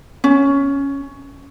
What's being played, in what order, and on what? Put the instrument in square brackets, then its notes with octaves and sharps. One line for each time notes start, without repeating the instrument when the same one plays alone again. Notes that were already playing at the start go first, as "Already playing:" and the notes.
[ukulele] C#4